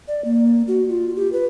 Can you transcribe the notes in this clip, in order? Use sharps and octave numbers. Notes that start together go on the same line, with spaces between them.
D5
A#3
F#4
F4
G4
B4